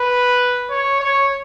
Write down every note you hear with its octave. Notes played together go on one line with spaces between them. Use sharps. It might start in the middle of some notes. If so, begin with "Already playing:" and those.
Already playing: B4
C#5
C#5